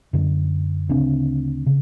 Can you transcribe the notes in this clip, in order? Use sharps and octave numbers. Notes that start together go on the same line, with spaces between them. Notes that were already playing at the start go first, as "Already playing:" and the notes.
F#2 D3
D2 C#3 C4 D4
C#3